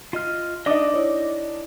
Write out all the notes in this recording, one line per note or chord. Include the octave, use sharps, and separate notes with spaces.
F4 D#5 F6
D4 D#4 D#5 D6 D#6
E4 C#5